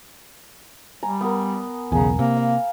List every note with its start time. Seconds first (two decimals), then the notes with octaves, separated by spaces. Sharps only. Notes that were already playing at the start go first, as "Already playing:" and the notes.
1.03 G3 G#5 A#5
1.21 B3 A#4
1.92 B1 E2 C#3 G#5 A#5
2.19 C3 A#3
2.37 F5